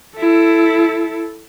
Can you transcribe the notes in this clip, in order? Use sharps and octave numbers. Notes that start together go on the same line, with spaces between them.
E4 A4